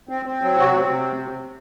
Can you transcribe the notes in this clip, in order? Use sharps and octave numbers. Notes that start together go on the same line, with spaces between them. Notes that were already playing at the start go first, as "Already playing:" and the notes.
C4
C4
F#3
C3 F#4
C4
C3